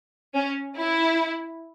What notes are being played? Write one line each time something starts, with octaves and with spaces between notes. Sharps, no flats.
C#4
E4